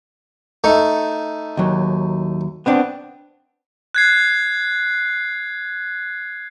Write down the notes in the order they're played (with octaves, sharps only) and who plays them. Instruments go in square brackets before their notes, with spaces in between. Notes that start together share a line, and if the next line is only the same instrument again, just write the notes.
[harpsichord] A3 D#4
[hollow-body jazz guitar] D#2 F#3
B3 C4 D4
[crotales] F#6 G#6 C7